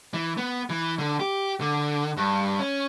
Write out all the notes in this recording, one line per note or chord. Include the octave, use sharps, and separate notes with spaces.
E3
B3
E3
D3
G4
D3
G2
C#4